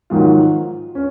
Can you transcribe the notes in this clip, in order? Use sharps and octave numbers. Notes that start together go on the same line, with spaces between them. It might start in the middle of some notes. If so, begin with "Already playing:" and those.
G#2 D#3 F#3 F4
C#4